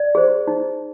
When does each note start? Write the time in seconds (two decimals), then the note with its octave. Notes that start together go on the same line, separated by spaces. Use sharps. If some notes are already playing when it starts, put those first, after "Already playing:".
Already playing: D5
0.15 G#4 C5
0.47 D#4